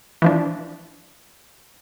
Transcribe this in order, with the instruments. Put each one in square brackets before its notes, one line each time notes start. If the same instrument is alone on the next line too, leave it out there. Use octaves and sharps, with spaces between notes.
[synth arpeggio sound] E3 F3 D4